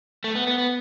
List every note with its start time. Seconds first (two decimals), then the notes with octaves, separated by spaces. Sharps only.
0.24 A3
0.35 B3
0.47 B3
0.58 B3